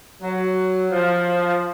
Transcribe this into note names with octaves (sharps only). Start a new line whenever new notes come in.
F#3
F3